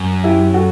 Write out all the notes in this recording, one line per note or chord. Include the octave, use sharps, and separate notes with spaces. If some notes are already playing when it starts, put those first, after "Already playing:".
Already playing: F#2
E4 G4
F#4 A4